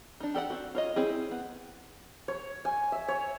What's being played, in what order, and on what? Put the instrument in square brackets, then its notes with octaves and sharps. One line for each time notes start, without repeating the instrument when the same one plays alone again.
[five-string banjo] D4 D#4
G4 A4 D5 F#5
C4 F#4
F4 C#5 D#5
C4 E4 G#4
B3
[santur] C#5
G#5
E5
C#5